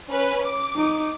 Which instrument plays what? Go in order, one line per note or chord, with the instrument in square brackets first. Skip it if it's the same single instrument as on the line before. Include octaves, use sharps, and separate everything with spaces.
[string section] C#4 B4
D6
[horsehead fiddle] D#4